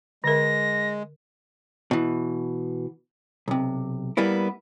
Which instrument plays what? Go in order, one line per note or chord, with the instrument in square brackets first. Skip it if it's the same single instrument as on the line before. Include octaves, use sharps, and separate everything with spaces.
[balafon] D3 A#4 [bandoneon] G#3 [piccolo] A#6
[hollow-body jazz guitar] B2 E3
B1 C3
G3 A#3 B3 E4